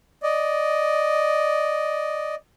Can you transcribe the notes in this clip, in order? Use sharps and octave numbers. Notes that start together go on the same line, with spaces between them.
D5 D#5